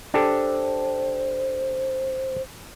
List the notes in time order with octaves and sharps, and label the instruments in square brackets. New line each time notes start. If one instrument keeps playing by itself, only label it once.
[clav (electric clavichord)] D4 G4 A4 [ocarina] C5